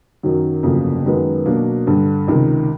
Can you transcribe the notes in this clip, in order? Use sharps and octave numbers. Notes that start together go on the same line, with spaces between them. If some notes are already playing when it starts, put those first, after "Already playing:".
F#2 D#3 F#3
G1 F2 C#3 F#3 A#3
F#2 D#3 G#3 B3
B2 F#3 A#3 D4
G2 D3 G3
C#2 C3 D#3